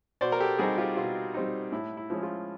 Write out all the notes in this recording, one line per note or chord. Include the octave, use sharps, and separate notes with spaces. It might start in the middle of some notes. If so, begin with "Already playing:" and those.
B2 C5 D5
A#4
G4 A4
G3 C4 D#4 F#4 G#4
F4 G4
B2 F4
G3 C4 D#4
A2 E4
E4
F3 G#3 C#4
F4